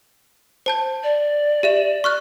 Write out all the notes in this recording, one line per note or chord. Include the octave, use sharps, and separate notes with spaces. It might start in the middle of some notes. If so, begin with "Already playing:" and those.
C5 A5 G6
D5
G4 E5 E7
C#6 F6 F#6